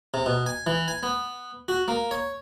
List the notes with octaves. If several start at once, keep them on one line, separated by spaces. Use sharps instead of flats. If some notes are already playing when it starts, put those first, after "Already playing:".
C3
B2
G#5
E3
G#5
B3
F#4
A#3
C#5